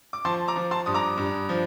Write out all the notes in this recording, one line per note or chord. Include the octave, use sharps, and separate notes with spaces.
D6
F3 A5 C6
A#5 D6
F3
A5 C6
G2 D#6
A#5 D6
G2
F3